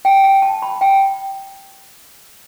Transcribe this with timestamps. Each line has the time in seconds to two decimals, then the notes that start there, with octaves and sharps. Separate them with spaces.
0.05 G5
0.23 G5
0.42 A5
0.62 B5
0.81 G5